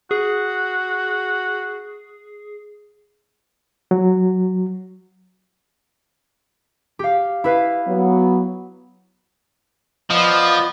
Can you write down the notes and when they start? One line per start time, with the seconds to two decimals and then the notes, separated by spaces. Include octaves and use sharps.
0.11 F#4 G#4
3.91 F#3
6.99 G4 F5
7.44 E4 B4 F5
7.88 F#3 B3
10.10 F3 B3 D5 D#5